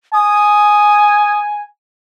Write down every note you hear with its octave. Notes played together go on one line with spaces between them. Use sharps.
G#5 D#6